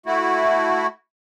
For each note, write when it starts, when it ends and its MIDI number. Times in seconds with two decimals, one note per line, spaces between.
0.06 0.87 57
0.06 0.87 64
0.06 0.87 66